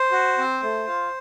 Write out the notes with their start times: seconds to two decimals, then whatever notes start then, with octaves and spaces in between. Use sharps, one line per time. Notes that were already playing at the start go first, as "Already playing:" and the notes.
Already playing: C5
0.12 F#4
0.38 C4
0.63 A3
0.87 F4